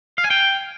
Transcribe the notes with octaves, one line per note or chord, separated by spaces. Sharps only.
F5
G#5
G5